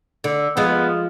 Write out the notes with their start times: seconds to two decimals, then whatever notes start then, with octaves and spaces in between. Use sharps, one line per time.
0.24 D3
0.57 F3 G#3 B3